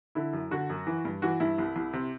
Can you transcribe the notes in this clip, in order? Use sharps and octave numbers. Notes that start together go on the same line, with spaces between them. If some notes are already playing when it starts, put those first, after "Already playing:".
D3 E4
F#2
D3 F#4
F#2
E3
G2
E3 F#4
G2 E4
C2
C2
C3